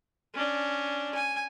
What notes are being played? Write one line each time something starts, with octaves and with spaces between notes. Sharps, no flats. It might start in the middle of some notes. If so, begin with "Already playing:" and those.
C#4 D4
G#5